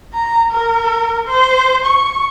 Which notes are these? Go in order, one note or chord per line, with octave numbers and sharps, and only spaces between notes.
A#5
A#4
C5
C#6